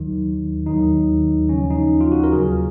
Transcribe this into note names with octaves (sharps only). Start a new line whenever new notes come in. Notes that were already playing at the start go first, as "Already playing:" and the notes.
Already playing: D#2 D#3 F#3 D#4
D#2 D#3 F#3 D#4
D#2 C#3 F3 C#4
D#4
F4
F#4
A#4
D#2 C#3 F#3 G#4